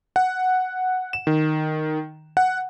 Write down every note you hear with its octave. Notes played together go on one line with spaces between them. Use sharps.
F#5
E7
D#3
F#5